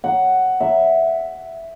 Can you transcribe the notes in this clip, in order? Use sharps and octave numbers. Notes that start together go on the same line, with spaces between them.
F#5
E5